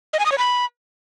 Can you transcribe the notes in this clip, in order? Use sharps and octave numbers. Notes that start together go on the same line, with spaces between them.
D#5
G#5
D#6
C#5
B5